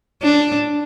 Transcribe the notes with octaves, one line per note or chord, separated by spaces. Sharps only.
D4